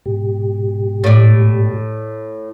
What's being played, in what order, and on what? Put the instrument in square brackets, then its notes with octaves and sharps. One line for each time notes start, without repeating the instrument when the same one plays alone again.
[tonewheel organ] G#2 B2 G4
[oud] A2 D5